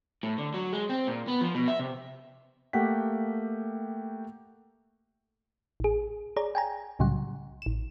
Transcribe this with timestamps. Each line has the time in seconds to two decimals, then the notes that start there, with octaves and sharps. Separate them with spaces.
0.23 A2
0.38 D3
0.54 F#3
0.73 G#3
0.89 C4
1.07 A#2
1.28 B3
1.41 F3
1.55 B2
1.68 E5
1.80 C3
2.73 A3 A#3 G4 F#5 G5 B6
5.80 A1 G#4
6.36 G#4 C#5 D5 A#5
6.55 G5 G#5 A#5
6.99 C2 A2 C#3 F#3 G3 F#5
7.62 A1 E7